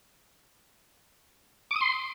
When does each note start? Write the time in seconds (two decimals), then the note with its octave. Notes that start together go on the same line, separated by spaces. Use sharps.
1.71 D6
1.76 D#6
1.81 C6